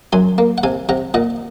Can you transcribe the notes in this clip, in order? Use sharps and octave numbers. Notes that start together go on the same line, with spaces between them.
F#2 G#5 C6
A#3
F#5
C3 F5 G#5
C3 F#5 A#5
A#2 D#5 F#5